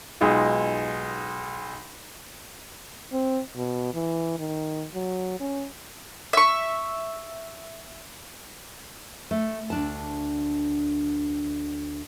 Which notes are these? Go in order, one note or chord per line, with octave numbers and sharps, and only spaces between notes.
B1 G#3 D#4 F4 G#4
C4
B2
E3
D#3
F#3
C#4
E5 C#6
A3
D2 D4 A5